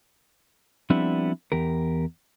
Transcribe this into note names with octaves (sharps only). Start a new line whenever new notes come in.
F3 G3 B3 C4 D4 E4
E2 G4 A#4